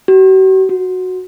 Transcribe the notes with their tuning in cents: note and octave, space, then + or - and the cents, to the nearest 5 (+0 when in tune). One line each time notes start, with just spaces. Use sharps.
F#4 +45
F#4 -5